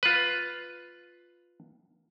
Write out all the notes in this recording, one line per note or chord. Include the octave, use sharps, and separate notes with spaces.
F4 B4